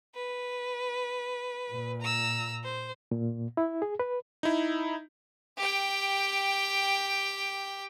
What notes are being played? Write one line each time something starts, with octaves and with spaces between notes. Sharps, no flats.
B4
A#2
A#5 E6
C5
A#2
E4
G#4
B4
D#4 E4
G4 G5